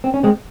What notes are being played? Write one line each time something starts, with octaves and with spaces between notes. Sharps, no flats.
C4
C#4
G#3 C4